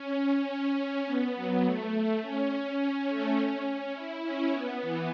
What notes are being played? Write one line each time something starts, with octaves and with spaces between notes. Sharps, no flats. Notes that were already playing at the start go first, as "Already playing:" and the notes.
Already playing: C#4
C#4
B3
F#3
A3
C#4
C#4
A3
C#4
C#4
E4
C#4
B3
E3